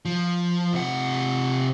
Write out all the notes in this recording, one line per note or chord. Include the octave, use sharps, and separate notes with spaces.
F3
C3 F#5